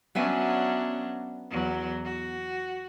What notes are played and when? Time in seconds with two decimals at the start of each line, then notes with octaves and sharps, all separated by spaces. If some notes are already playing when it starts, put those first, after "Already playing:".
0.15 F#3 B3 C#4 D4 E5 G#5
1.50 E2 F#3
2.04 F#4